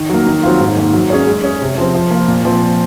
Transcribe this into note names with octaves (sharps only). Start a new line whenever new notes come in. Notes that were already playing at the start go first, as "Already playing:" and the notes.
Already playing: D#3
F#3 A#3
D#3
F#3 C4 F4
G#2
D#3 A#3
F#3
C#4 G#4 C#5
G#3
C#4 G#4
C3
F3 C4
F3
A#3 F4
A#2
F3 C4